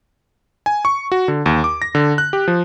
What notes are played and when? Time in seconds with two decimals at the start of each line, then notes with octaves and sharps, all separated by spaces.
0.66 G#5
0.85 C#6
1.12 F#4
1.28 D3
1.46 D#2
1.64 D6
1.82 A#6
1.95 D3
2.18 F#6
2.33 G4
2.48 F3